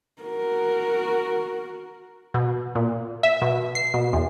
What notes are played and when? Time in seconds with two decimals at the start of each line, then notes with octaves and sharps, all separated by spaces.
0.22 F#4 A#4
2.34 B2
2.75 A#2
3.23 E5
3.42 B2
3.75 C7
3.94 B2
4.13 E2